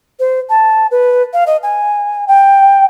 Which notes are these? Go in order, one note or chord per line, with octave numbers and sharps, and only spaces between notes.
C5
A5
B4
F5
D#5
G#5
G5